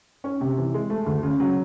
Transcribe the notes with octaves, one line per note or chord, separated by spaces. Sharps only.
C#4
C3
E3
G#3
A3
D2
C#3
F#3